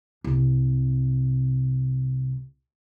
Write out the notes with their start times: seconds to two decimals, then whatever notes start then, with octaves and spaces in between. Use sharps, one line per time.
0.24 C2 C3